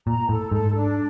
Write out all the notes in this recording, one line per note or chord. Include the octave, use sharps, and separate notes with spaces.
A#2 A#5
A2 A4
G#2 A4
D4